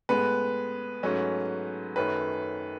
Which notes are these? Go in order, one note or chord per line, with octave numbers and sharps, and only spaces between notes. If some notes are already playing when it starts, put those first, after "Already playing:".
A2 G#3 B3 B4
G#2 F#3 A3 C#4
F#2 D#3 A3 C#4 B4